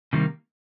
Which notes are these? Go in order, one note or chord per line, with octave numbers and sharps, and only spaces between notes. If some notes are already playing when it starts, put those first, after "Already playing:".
C3 D#3 G3 A#3